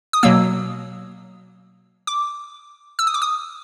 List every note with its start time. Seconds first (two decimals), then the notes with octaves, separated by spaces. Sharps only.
0.13 D#6
0.23 B2 F#3 A#3 E6
2.07 D6
2.99 E6
3.07 D#6
3.14 D6
3.22 D#6